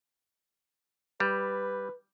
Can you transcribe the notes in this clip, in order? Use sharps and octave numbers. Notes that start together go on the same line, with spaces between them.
G3 B4